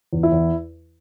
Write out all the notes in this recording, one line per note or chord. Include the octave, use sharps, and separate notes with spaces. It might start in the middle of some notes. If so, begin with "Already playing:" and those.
E2
E4
E2